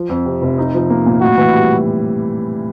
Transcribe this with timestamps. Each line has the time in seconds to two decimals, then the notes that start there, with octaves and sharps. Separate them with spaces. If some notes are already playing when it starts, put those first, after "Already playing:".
Already playing: F3
0.09 F2
0.26 C3
0.42 F1
0.58 D#4
0.74 F3
0.90 A#3
1.06 A#2
1.21 A2 F#4
1.37 E3
1.53 G3